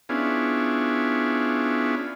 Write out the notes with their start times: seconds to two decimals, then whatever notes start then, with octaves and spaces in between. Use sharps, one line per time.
0.09 B3 C#4 D4 E4 F4 G#4